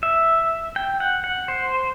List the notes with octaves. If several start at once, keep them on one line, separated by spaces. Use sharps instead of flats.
E5
G5
F#5
F#5
C5